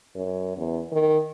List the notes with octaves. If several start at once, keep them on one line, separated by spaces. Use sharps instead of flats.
F#2
E2
D#3